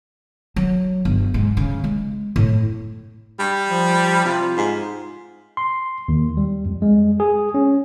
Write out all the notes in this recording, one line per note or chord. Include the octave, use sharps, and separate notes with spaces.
F#3
G1
G#2
C#3
G#3
A2
G3
F3
C3 F4
G#2
C6
D#2
G3
F2
G#3
G#4
C#4